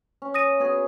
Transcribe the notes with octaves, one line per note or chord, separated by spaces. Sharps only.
C#4
D#6 A#6 D#7
B3 F#4 G#4